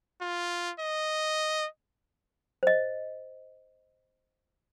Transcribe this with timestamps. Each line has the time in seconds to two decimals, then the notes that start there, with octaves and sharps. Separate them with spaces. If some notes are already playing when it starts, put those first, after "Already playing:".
0.21 F4
0.79 D#5
2.63 C5 D#5